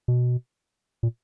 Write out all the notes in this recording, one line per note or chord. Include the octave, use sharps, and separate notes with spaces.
B2
A#2